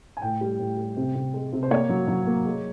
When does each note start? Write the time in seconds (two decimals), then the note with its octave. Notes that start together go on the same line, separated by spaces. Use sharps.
0.17 G#5
0.22 A2 G5
0.41 G3
0.59 A2
0.77 G3
0.97 C3
1.15 C3
1.34 G#3
1.52 C3
1.63 C5
1.71 A#3 C#5
1.89 F#3
2.08 F#3
2.27 A#3
2.46 G#3